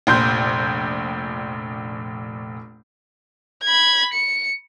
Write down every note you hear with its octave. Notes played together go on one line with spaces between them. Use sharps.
F1 A#1 C6 G6
B5 G#6
C#7